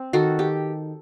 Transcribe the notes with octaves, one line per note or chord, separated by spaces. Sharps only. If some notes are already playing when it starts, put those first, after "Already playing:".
Already playing: C4
D#3 F#4 A4
G4